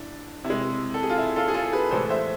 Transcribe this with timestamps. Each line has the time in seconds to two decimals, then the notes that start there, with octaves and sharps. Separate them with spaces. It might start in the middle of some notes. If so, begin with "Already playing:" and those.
Already playing: D4 E4
0.44 C3 E4
0.50 G#3
0.94 A4
1.03 G#4
1.10 F4
1.18 E4
1.36 F4 A4
1.48 G#4
1.54 F4 A4
1.73 G#4 B4
1.91 A2 E3 G#3 A4 C5
2.09 C5 E5